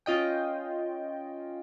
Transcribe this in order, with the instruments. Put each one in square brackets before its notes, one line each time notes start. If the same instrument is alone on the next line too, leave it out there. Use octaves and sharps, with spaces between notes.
[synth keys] C#4 F4 D#5 G5